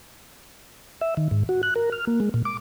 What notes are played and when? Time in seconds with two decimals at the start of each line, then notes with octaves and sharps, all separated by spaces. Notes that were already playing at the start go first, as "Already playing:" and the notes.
1.01 E5
1.17 D#3
1.31 G#2
1.49 F#4
1.63 F#6
1.76 A#4
1.92 F6
2.07 A#3
2.20 G#3
2.34 A#2
2.45 D6